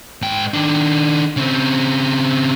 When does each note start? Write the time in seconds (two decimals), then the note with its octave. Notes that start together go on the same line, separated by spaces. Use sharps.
0.22 G#2 G5
0.54 D#3 D4
1.37 C#3 C4